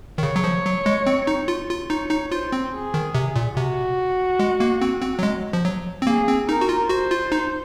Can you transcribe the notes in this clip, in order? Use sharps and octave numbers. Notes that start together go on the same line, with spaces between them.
D#3
C#3 C#5
F#3
F3
F#3
G#3
C4
D#4
F4
F4
D#4 C#5
D#4
F4 C5
C4
G#4
D#3
C3
A#2
C3 F#4
G#3
A#3
C4
C4
F#3
G#3
F3
F#3
C4
A#3 G#4
C4
D#4 A#4
F#4
F4
F#4 C5
F4
D#4